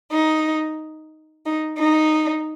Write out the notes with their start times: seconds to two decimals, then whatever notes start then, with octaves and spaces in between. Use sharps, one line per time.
0.12 D#4
1.45 D#4
1.78 D#4